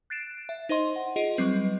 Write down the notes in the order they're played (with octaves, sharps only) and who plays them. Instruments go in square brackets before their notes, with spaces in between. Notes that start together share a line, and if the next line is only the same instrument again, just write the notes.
[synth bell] F#6 A6 C7 D7 E7
E5
D#4 C5 D#5 C6
F#5
F4 G#4 D#5 D7
F#3 G3 C4 B4 D#5